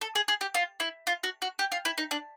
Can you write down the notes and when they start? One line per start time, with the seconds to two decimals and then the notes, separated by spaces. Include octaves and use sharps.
0.01 A4
0.15 G#4
0.28 G#4
0.41 G4
0.54 F4
0.80 E4
1.07 F4
1.23 F#4
1.42 F#4
1.59 G4
1.72 F4
1.85 E4
1.98 D#4
2.11 D4